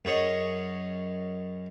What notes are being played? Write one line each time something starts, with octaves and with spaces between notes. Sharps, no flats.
F#2 G#4 C#5 D#5